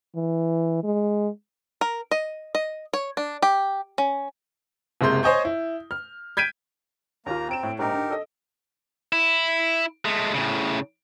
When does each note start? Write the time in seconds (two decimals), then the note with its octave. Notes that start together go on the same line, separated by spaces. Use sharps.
0.16 E3
0.84 G#3
1.81 A#4
2.11 D#5
2.55 D#5
2.93 C#5
3.17 D4
3.42 G4
3.98 C#4
5.01 F#1 C3 G#3 C6 G6
5.23 C5 C#5 D#5 G#5 C#6 G6
5.45 E4
5.91 F6
6.37 G6 G#6 B6 D7 D#7
7.26 D#2 A#3 F4 A#5
7.49 C4 A#5 D7 E7
7.63 A2
7.79 A#1 G#2 D#4 G4 A#4
7.94 D3
8.10 A4 D#5
9.13 E4
10.05 G#3 A3
10.34 A2 C#3